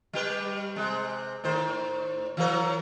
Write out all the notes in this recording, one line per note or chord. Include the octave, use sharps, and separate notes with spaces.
G3 G4 B4
C3 G#3
A2 D#3 C5
E3 F#3 A#4